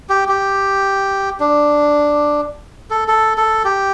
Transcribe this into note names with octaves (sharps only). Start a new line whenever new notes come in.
G4
G4
D4
A4
A4
A4
G4